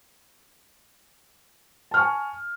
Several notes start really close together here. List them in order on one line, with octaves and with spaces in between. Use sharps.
A5 F6 C#6 G#5